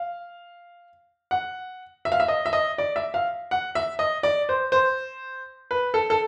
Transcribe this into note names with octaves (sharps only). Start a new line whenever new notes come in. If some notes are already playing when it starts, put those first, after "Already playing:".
Already playing: F5
F#5
E5
F5
E5
D#5
E5
D#5
D5
E5
F5
F#5
E5
D#5
D5
C5
C5
B4
A4
A4